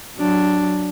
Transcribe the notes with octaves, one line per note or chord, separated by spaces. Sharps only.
F#3 D4